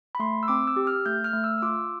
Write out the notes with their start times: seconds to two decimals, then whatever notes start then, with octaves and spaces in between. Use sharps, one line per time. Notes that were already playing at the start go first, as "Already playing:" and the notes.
0.15 B5
0.19 A3 C6
0.43 E6
0.48 C4 D6
0.67 E6
0.76 G4
0.87 F6
1.06 A3 G6
1.24 F6
1.33 A3
1.44 E6
1.58 E6
1.62 F4 D6